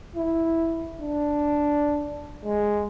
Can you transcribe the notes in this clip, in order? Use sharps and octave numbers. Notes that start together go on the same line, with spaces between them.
E4
D4
G#3